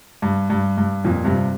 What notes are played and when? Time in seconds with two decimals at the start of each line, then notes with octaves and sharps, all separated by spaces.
0.22 G2
0.50 G2
0.78 G2
1.05 F2 A#2
1.25 G2 C3